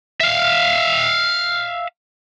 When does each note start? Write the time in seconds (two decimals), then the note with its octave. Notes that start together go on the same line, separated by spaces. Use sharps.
0.21 E5 F5